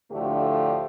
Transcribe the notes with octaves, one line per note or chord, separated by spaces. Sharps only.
D2 A2 D3 F3 A3 G4